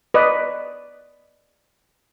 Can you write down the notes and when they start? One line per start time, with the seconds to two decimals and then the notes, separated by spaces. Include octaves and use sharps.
0.14 B4 D5 D#5